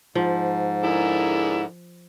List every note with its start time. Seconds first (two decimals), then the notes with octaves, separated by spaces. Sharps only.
0.15 G#2 F3
0.84 D3 E4 G#4 A#4